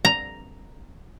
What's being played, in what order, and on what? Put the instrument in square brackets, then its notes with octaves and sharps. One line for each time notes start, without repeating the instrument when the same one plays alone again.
[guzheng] A#5